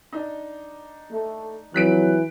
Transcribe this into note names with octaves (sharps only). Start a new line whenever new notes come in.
D4 D#4
A3
F2 E3 F#3 F#6 B6 D7